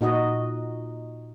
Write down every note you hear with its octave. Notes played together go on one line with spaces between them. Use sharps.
A#2 D#4 F#4 D#5